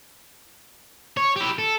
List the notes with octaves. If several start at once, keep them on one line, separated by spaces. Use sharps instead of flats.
C#5
E4 G4
A4